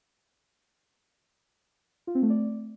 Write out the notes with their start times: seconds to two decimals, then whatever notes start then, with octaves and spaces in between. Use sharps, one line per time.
2.07 F4
2.15 C4
2.22 A3
2.30 D5